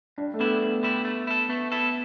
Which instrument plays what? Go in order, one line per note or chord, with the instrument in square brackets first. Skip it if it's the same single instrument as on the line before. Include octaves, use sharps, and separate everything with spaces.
[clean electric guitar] G2 [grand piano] D4
[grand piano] A3
[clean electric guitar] D3 G3 E4 [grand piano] B3
[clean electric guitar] G2
D3 G3 E4
A3
E4 A4
[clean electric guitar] A3 [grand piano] B3
[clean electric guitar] E4 A4